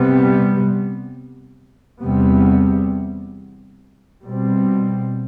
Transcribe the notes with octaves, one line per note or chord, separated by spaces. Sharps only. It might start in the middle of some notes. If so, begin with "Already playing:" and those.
Already playing: C3 G3 B3
E2 C3 G3 B3
B2 G3 C4